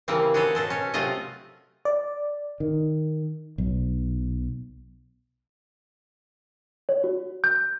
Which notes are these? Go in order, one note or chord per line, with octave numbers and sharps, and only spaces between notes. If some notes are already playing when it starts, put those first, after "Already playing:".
C#3 E3 G3 A#3 C4
F#4 G#4 A4 C5 C#5
B2 A4 C5
C#4 C#5
C3 F#3 A3 F4 D#5
D5
D#3
B1
C#5
F#4
G6